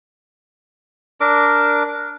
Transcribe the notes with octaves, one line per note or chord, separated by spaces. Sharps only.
D4 A#4 D6